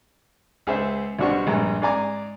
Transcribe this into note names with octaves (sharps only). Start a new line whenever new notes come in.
C#2 G#4 C5 E5
B1 G3 D4 F#4 C5 C#6
A#1 G2 G#3 A#5
G#2 D5 G#5 A#5 D6